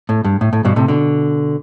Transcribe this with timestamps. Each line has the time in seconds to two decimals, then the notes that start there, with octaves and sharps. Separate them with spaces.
0.09 A2
0.24 G2
0.41 A2
0.53 A2
0.65 G2 B2
0.76 A2 C3
0.88 B2 D3